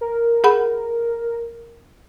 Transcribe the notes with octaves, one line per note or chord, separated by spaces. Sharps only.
A#4
G#4 F#5 B5